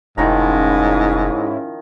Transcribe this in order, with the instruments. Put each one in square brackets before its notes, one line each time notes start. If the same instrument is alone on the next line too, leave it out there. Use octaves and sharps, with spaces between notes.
[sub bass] F1 [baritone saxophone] G#2 [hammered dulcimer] D#3 F3 A#5 [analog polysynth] C#4 E4